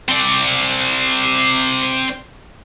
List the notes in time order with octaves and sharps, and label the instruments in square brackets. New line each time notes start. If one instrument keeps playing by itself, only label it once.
[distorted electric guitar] C4 D5